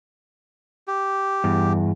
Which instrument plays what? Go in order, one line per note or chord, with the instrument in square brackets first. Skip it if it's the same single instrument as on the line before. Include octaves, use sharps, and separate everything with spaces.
[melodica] G4
[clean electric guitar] E2 [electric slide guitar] G2